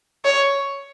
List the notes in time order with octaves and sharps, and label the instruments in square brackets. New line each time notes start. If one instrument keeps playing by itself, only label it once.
[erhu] C#5